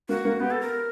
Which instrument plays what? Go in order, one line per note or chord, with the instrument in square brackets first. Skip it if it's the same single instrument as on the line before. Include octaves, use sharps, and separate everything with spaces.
[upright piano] A#3 [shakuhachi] F#4
[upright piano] A#3
[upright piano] B3 [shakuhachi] G4
[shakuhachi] A4
A#4